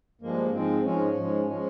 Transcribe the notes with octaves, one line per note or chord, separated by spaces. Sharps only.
G2 F3 G#3 A#3
G#2 F3 G#3 C4
G#2 F3 G#3 C#4
G#2 F3 G#3
F3 G#3 C#4